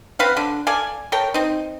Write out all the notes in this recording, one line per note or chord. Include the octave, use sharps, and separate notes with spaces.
C4 B4 F5 F#5
D3
A4 D5 F5 G#5
A4 A#4 C#5 G5
C4 D#4